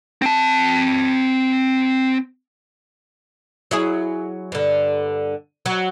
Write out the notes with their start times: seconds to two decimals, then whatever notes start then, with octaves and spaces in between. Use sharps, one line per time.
0.22 C4 A5
3.71 F#3 E4 G#4
4.52 G2 D3
5.66 F#3